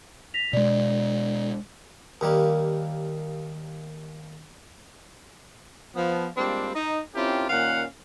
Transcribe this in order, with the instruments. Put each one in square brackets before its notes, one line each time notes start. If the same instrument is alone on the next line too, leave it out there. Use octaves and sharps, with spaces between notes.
[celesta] A#6 B6 F7
[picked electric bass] B2 G#3 [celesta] D5
[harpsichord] D#2 G3 A#3
[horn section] F3 B3
G3 G#3 A#3 C4 D4 F4
D#4
C4 C#4 E4 F4 G4 A#4
A#2 D#3 C#4 F5 F#5